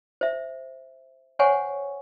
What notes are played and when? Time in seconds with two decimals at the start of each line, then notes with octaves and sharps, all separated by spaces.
0.21 C5 E5
1.39 C5 C#5 F#5 G#5 C#6